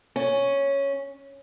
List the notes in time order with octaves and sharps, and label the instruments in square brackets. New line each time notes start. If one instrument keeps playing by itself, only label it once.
[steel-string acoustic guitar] C#4